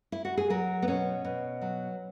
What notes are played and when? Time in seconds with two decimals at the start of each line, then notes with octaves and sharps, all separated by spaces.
0.12 E4
0.25 F#4
0.37 G#4
0.50 F#3 A#4
0.82 B3
0.88 B2 C#4
1.25 B2
1.62 F#3